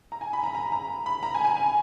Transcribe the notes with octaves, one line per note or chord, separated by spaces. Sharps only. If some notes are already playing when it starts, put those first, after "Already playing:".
A#5
G#5
B5
A#5
A#5
A#5
B5
A#5
G#5
G#5
G#5